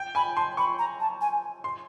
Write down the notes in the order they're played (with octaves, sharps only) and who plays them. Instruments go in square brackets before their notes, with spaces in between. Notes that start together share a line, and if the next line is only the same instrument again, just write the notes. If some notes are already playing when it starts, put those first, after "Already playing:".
Already playing: [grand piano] G5
[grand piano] G#5 [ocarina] B5
[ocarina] A5 [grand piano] C6
[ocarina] B5 [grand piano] C#6
[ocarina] A#5
A5
G#5
[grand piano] C6